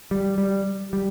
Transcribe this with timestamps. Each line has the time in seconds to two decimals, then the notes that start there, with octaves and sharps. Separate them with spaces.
0.11 G3
0.38 G3
0.93 G3